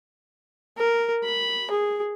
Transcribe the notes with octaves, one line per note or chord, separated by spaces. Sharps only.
A#4
B5
G#4